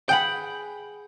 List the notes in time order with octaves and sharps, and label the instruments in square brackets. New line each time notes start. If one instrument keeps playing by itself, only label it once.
[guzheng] G#4 F#5 B5 [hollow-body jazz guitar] G5 [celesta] G6 F#7